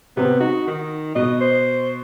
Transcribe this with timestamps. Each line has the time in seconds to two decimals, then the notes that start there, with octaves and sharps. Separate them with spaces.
0.17 C3 B3 C4
0.40 D#4 F#4
0.68 D#3
1.16 B2 D#5
1.41 C5